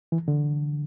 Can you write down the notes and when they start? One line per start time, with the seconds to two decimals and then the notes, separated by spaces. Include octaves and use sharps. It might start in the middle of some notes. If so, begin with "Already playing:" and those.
0.12 E3
0.28 D3